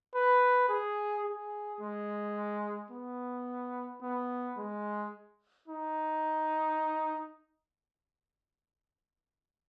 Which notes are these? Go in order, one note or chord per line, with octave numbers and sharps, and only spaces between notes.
B4
G#4
G#4
G#3
B3
B3
G#3
D#4